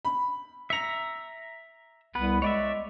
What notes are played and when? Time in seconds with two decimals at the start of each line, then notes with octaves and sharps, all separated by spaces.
0.05 B5
0.70 E5 A#5 C#7 F7
2.15 C2 B3 B4
2.42 G#3 C#5 D5 E5